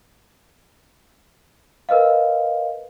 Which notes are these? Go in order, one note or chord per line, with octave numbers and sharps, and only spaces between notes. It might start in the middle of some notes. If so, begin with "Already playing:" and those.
A#4 B4 D#5 F5